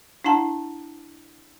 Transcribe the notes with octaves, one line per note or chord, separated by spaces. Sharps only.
D4 E4 F#5 A5 A#5